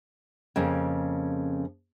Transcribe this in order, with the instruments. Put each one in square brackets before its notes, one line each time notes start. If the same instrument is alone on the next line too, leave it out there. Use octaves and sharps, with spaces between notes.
[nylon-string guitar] F2 C#3 A#3